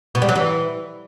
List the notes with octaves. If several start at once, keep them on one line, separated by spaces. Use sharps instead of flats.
B2
G3
F#3
E3